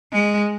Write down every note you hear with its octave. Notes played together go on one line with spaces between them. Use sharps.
G#3